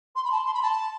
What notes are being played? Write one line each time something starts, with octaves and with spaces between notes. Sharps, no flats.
C6
B5
A5
C6
B5
A5